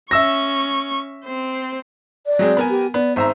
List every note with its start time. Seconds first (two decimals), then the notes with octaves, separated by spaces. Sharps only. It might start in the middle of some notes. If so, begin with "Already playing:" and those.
0.11 C#4 E5 C#6 E6 A#6
1.24 C4 C5
2.26 D5
2.39 F#3 G#3 C4
2.57 B3 A#4 G#5
2.70 G4
2.94 B3 D5
3.16 G#1 C5 E5 A#5